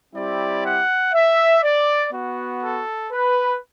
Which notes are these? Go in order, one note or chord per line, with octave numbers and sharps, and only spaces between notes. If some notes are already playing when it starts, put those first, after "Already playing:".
G3 C4 E4 G4 D5
F#5
E5
D5
B3 F#4
A4
B4